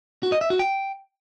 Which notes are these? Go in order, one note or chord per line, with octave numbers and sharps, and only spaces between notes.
F#4
D#5
E5
F#4
G5